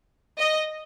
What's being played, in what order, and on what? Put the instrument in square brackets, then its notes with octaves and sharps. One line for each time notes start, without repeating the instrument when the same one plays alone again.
[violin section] D#5